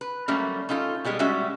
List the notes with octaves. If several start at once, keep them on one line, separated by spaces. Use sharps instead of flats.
B4
F#3 G3 A3 A#3 C#4
C#4 D#4 F4 A4
B2 G3 G#3 G4
G3 G#3 C#4 F#4 E5